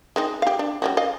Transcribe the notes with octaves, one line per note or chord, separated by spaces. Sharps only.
G#3 C4 D#4
G4 F5
D4
G3 C#4 F#4
D#5 F5